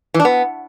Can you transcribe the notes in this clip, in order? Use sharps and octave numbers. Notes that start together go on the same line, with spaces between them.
E3
D4
B3